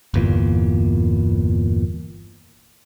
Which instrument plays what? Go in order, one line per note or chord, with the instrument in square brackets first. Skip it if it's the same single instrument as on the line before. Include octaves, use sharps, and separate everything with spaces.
[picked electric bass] G1 E2 A#2